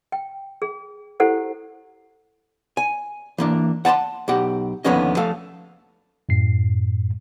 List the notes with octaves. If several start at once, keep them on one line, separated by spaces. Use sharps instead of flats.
G5
G#4
E4 G4 A4 C5 F#5
G#5
E3 A#3 D4
F#5 A5 A#5 C6
B1 B2 G4 F#5
D#2 D3 F3 B3 C#4 D#5
F3 A3 A4 F5
F#2 A2 C7